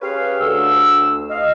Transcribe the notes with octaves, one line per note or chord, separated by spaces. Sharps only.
C#4 G4 G#4 B4 C#5 F5
D2 E6
D#5 F5